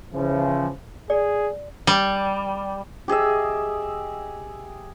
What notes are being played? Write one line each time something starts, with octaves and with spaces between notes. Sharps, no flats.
C#3 E3 F3
G#4 D5
G3
G4 G#4 D#5 E5